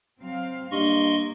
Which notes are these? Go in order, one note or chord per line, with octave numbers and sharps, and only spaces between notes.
F#3 C4 F5
G2 A#3 D#5 C6 C#6